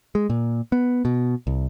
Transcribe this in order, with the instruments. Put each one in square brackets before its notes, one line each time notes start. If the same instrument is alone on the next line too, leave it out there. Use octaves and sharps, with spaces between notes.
[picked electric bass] G#3
A#2
B3
B2
C2